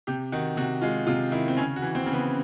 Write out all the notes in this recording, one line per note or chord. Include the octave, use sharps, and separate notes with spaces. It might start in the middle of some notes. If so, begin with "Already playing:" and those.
C3 G4
D#3 F#4
C3 F#4
G#3 F4
C3 F4
D#3 E4
C4
C#3 C#4
F#4
E3
C4
C#3
B3